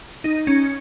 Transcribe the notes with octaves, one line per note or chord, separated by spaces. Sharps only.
D#4
C#4